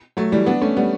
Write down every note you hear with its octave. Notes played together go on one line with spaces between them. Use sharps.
F#3 A3
E3 G3
B3 D4
A3 C#4
G3 B3